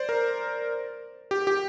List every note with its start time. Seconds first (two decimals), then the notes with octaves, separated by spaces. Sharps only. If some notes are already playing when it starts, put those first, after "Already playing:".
Already playing: C5 D5
0.09 A#4
1.31 G4
1.47 G4